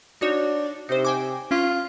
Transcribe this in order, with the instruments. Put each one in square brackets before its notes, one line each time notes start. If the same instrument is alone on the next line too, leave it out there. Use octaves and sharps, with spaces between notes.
[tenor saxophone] D4 [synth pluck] D#4 F#4 C#5
[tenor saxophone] C3 [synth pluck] D#4 C5
[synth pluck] G5 G#5 D6
[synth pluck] C#4 [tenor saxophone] F4